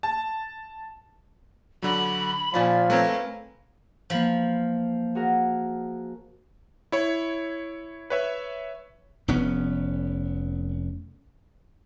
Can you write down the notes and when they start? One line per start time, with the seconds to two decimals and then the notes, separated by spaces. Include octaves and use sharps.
0.03 A5
1.82 D3 F#3 B5
2.54 A#2 F3 C#4 D5 B5
2.90 A3 C4 A#4 B4 C#5
4.10 E3 F3 A#3 B5
5.15 F#4 G#4 A#4
6.92 E4 C#5
8.10 B4 C#5 E5
9.28 F1 B3 C#4